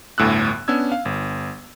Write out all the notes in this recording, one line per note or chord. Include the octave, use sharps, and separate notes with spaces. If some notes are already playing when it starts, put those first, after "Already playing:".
G1 D2 A2 E6 F#6
B3 C#4 D4 E6 G#6
F5
G1